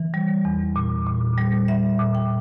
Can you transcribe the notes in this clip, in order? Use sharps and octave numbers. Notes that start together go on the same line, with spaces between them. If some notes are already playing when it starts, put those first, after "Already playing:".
Already playing: E3
G3
E2
A#2
A#2
G3
G3 E5
A#2
G5